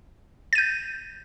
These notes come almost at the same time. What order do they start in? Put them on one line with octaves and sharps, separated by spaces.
A6 D#7 G6